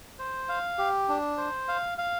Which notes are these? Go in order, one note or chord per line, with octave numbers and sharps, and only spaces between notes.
C5
F5
G4
D4
C5
F5
F5